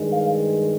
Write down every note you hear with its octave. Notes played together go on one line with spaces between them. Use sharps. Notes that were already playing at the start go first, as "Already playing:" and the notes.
Already playing: G2 D#3 G#3
F5